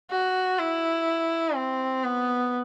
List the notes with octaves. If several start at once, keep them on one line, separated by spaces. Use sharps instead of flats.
F#4
E4
C4
B3